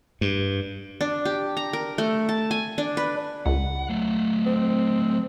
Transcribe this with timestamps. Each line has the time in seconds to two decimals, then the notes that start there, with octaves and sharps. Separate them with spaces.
0.21 G2
1.01 D4
1.25 G4
1.57 A#5
1.73 A#4
1.98 A3
2.29 A5
2.51 G#5
2.78 D4
2.97 B4
3.46 C#2 F#5
3.89 F#3 A3
4.46 C4